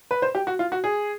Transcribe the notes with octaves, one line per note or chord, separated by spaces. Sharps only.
B4
C5
G4
F#4
F4
F#4
G#4